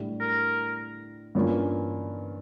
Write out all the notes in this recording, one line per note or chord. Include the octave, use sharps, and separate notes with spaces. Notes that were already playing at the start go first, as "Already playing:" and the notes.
Already playing: A2 G3 D4
A#4
G2 E3 A#3 C#4 F4